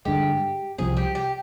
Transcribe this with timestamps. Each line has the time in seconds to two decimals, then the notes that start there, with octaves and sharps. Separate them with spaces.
0.05 G2 D3 G#3 G4
0.78 C2 C3 F3 C4 G#4
0.97 G4
1.15 G4